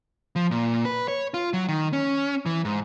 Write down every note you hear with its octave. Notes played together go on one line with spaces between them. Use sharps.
F3
A#2
B4
C#5
F4
F#3
D#3
C#4
E3
G#2